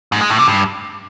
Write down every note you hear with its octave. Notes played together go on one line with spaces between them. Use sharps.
G#2
G#3
A2
C3
G2